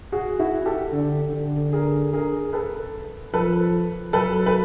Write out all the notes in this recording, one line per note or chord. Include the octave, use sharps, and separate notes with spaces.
F#4 G#4
E4 F#4
G4 A4
D3
D3
G#4 A#4
G#4 A#4
A4 B4
F3 A4 B4
F#3 A4 B4
B4